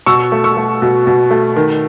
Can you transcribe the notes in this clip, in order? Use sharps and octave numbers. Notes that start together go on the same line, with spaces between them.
B2 C#6 E6
A3
C#6 E6
A3
B2
B2
A3
D#3